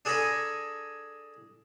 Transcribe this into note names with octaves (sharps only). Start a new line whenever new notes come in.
D4 G#4 A4 G#5 A#5 B5